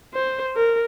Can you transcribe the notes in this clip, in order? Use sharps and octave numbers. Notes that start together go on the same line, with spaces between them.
C5
A#4